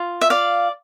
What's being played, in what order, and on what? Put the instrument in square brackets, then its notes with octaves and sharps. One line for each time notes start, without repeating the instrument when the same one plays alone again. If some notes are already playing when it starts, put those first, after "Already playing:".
Already playing: [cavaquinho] F4
E5
D5 F5